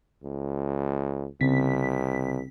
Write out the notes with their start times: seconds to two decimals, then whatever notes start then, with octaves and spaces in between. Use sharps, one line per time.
0.24 C#2
1.41 C2 C#3 C4 B6